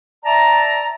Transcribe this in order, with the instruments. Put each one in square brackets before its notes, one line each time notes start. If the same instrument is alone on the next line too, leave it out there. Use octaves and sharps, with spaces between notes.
[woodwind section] D5 E5 A5 A#5